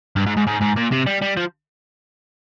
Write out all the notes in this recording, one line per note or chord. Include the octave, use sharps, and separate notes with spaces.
G2
G#2
G#2
G#2
G#2
A#2
C3
G3
G3
F3